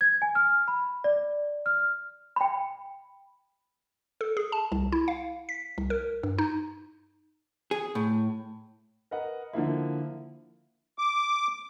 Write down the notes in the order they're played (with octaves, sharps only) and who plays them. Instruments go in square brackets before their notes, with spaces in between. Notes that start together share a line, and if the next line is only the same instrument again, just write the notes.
[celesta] G#6
G#5
F6
B5
D5
F6
[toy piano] G5 B5
[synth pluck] A4
G#4
A5
C2
E4
F5
B6
C2
A#4
G2
D#4
[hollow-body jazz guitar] G#4
A2
[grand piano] A#4 B4 D#5 F#5
D3 F3 A#3 E4
[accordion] D6